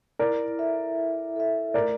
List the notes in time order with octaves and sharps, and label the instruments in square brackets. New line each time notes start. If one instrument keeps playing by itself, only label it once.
[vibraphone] E4 [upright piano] A#4 D5
[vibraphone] A4 E5
E4
A4 E5
[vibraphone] A3 [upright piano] A#4 D5